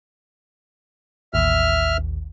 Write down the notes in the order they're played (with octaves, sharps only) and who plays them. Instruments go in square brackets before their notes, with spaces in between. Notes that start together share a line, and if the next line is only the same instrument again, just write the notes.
[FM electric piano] A1 D#2 [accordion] E5 F6